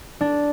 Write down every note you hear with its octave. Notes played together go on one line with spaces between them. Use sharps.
D4